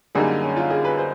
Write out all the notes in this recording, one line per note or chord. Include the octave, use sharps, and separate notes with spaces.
F#2 D3 G3 A#3 D#4 G#4
C#4
F4
G#4
B4
C5